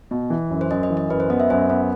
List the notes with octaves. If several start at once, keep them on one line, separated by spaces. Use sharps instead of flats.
B2
E3
F#2
C5
F#2 D#5
D#5
E3
D#5
F#2 B4
C5
B3 D#5
E5
F#2 C5
B3